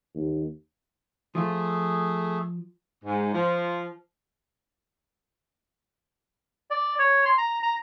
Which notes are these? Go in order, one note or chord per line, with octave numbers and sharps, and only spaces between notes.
D#2
F3 A3 F4 G#4
G#2
F3
D5
C#5
C6
A#5
A#5